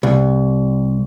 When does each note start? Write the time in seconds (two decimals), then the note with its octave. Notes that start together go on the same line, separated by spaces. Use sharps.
0.03 C2